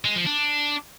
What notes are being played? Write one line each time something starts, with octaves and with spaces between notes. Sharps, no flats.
G#3
F3
D4